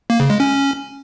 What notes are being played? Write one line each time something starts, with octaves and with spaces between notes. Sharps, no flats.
A#3
C#3
G#3
C#4